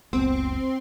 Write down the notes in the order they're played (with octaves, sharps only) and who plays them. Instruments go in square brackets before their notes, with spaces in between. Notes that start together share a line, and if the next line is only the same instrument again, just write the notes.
[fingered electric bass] F#1 C#2 B3 [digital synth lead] C4